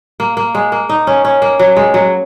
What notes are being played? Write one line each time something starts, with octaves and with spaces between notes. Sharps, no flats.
A#3
A#3
G#3
A#3
D#4
C#4
C#4
A#3
F#3
G#3
F#3